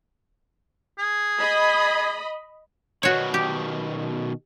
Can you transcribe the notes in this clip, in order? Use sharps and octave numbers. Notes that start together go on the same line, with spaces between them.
G#4
D#5 B5
B2 D#3 F#4 C#5
G4